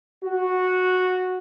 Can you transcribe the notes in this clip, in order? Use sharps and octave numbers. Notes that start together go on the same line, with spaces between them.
F#4